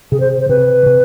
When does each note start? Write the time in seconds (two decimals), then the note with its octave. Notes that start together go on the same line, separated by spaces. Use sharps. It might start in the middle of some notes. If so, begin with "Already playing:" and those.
0.12 C3 G#4
0.20 C5
0.39 C5
0.49 C3 B4
0.86 C3